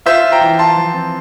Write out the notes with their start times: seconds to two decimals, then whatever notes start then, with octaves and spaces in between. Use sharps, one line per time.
0.06 F4 C5 E5
0.24 F4
0.32 G5 A#5
0.41 E3
0.59 F4 A5 C6
0.76 F3
0.94 C4